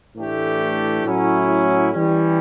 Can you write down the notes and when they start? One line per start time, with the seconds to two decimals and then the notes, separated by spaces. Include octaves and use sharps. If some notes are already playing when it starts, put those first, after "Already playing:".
0.16 A2 E3 A3 D4 G4
1.04 A2 F#3 C#4 E4
1.92 E3 G3 C#4